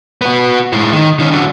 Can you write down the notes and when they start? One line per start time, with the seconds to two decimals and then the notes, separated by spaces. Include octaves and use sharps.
0.21 B3 F#4
0.73 A2 G#3
0.93 D#3
1.19 D#3 C#4
1.31 D3 F#3